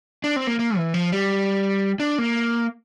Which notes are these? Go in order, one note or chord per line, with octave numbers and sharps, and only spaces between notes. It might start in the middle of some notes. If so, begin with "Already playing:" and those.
D4
C4
A#3
A#3
E3
F3
G3
D4
A#3